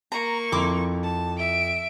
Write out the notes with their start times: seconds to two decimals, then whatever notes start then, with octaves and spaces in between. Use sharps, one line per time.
0.12 A#3 A#5 C#6
0.52 F2 E4 C6 D6
1.03 A5
1.38 E5 D7